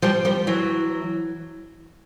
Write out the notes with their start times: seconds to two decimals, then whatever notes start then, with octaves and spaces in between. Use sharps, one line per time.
0.02 F3 G3
0.25 F3 G3
0.47 E3 F#3